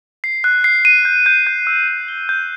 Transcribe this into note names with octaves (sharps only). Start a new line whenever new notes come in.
C7
F#6
C7
D#7
G6
G6
G6
E6
D#7
G7
G6